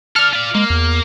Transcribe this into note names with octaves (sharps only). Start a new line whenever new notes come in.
A4 D5 F6
F4 D5
G#3 A#3
E2